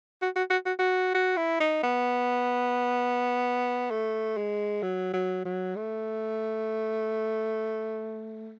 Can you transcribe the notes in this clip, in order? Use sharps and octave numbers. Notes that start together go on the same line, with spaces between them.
F#4
F#4
F#4
F#4
F#4
F#4
E4
D#4
B3
A3
G#3
F#3
F#3
F#3
A3